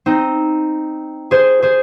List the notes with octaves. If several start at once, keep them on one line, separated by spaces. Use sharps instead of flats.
C4 D#4
G#4 C5
G#4 C5